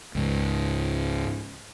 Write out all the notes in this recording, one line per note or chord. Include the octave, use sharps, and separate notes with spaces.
C#2 G#2